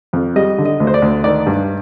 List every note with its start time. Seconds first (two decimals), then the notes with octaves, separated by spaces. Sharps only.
0.13 F2
0.36 G3 D#5
0.58 D3
0.65 D#5
0.80 D2
0.87 C5
0.94 D5
1.02 D2
1.24 D#3 D5
1.46 G2